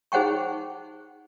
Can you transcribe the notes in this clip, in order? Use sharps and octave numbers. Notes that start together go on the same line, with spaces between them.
D#4 G#4 C5 F#5 G5 C#6